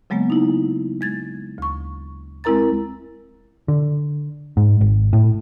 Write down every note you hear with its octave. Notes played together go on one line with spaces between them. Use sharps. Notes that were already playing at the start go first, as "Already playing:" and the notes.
C#3 F#3 G#3 A#3 B3
D#4 E4
G#3 G#6 A6
D2 C#6
G#3 C4 E4 A#4 A#5 A6
D3
G#2
G#1
A2